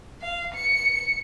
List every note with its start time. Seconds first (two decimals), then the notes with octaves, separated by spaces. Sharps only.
0.21 F5
0.54 C#7